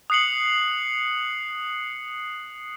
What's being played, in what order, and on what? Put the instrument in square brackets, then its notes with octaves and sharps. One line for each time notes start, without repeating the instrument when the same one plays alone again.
[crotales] D#6 F#6 C7 C#7 F#7